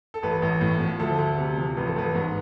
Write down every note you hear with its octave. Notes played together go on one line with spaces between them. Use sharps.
A4
A1 B4
A1
A2
F3
D2 A4
D2
C3
F3
A1 B4
A4
A1 B4
G#2